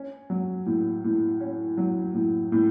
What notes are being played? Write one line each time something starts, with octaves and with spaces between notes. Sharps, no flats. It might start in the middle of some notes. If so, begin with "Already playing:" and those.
Already playing: C#4
F#3
A2
A2
C#4
F#3
A2
A2